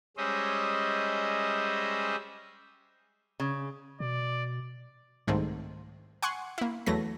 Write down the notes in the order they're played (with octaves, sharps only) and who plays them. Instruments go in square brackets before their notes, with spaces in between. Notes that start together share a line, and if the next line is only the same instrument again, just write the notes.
[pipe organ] G3 G#3 C#4 C5 D#5 E5
[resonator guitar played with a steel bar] C#3
[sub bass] B2 [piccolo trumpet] D5
[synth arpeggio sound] C2 G#2 D#3 A3 C4
F#5 G#5 C6 C#6
A#3 E4
E2 F#3 A3 B4 A#6